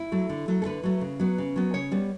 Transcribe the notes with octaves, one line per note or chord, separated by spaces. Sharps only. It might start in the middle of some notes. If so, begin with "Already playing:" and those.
Already playing: E4
F#3 A3
D3
F#3 A3
A4
D3 B4
F#3 A3
C#3
F#3 B3
C#3
F#3 B3
C#3 C#5
G3 B3